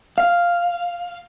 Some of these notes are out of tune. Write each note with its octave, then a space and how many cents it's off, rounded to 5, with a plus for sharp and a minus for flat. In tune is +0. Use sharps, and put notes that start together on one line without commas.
F5 +0